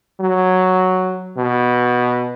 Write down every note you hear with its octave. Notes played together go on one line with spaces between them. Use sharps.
F#3
B2